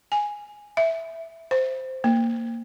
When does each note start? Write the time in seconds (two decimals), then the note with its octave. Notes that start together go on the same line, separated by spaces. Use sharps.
0.12 G#5
0.77 E5
1.51 C5
2.04 A#3